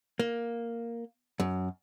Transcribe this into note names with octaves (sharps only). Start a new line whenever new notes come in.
A#3
F#2